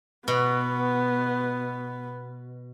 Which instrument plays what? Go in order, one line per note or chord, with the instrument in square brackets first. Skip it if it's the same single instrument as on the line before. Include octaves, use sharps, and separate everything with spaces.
[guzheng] B2 [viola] B3